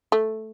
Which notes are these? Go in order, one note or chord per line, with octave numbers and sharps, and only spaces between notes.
A3